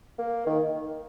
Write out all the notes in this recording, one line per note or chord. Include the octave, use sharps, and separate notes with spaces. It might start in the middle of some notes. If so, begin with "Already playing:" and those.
A#3
D#3